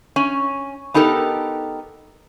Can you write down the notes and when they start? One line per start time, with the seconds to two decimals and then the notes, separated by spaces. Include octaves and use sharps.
0.16 C#4
0.94 B3 D#4 G4 A4 A#4